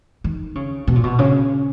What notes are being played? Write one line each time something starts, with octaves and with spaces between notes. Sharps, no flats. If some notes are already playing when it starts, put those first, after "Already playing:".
D#3
C#3
B2
A#2
B2
C#3